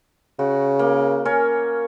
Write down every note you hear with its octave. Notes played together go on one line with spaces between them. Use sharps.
C#3 F#4
A#3
C#4 A#4 C#5